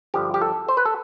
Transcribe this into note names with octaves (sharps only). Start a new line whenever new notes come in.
G2 D3 F3 G4
G4
A4
C5
B4
A4